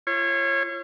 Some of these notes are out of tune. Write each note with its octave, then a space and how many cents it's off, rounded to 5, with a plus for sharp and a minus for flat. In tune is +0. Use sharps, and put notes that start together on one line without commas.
F4 -40 C#5 -20